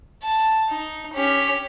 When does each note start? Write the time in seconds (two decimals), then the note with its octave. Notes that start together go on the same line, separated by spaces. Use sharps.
0.23 A5
0.70 D#4
1.14 C#4 G4